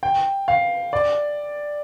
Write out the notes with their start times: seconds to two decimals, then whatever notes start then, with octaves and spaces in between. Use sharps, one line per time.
0.03 G5
0.48 F5
0.93 D5